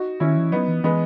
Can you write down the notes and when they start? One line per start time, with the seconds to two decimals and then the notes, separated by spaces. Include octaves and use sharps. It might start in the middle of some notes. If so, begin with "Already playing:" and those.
Already playing: D#4 F#4
0.20 D#3 C#4 E4
0.37 E3
0.52 F#3 B3 D#4
0.68 E3
0.84 E3 G#3 B3